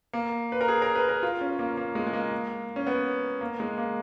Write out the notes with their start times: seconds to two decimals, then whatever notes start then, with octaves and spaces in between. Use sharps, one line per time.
0.13 A#3
0.52 B4
0.61 A#4
0.68 G#4
0.82 A#4
0.95 B4
1.09 A#4
1.23 F4
1.41 C#4
1.59 A#3
1.77 A#3
1.95 G#3
2.07 G#3
2.13 A#3
2.76 C#4
2.87 B3
3.41 A#3
3.60 G#3
3.78 A#3